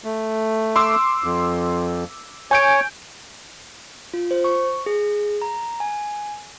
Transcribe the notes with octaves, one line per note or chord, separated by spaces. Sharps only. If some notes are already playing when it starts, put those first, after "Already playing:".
A3
C6 D6 E6
F2
C#5 G#5 G6 D7
F4
C5
C#6
G#4
A#5
G#5